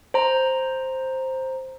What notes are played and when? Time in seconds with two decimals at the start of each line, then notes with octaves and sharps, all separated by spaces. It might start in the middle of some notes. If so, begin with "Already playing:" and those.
0.14 C5 A#5